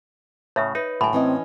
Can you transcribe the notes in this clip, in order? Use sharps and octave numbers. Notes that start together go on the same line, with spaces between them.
A2 C#3 C#5 E5
D#4 B4
A2 D3 F#3 G#5 B5
E3 C4 C#4 D#5